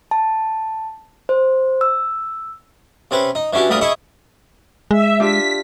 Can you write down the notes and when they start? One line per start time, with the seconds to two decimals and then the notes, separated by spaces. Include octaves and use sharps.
0.11 A5
1.29 C5
1.81 E6
3.11 C3 C4 C#4 B4
3.35 D#4
3.53 E3 C#4 D4 F#4 G4
3.70 D2 A#2 G3 A#4 D#6
3.81 E4 G#4 D#5 E5 C#6
4.91 G#3 E5
5.20 D4 F4 G4 B6